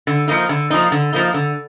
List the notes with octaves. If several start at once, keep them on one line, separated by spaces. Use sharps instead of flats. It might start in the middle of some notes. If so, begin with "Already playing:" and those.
D3
F3 A#3 D#4
D3
F3 A#3 D#4
D3
F3 A#3 D#4
D3